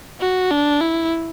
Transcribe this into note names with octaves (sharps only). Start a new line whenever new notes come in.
F#4
D4
E4